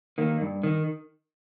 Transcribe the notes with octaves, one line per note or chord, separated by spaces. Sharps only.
D#3 A#3
G2
D#3